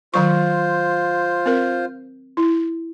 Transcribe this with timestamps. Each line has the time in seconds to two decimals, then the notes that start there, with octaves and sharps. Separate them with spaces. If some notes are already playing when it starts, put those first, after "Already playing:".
0.14 D#3 F#3 F4 C5 C#6
1.46 C4 A#4
2.37 E4